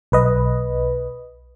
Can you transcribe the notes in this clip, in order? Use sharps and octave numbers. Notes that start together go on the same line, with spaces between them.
B1 B4 D#5